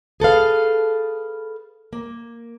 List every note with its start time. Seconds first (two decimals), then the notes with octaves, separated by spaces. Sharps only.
0.20 G#4 A4 B4 F5
1.93 A#3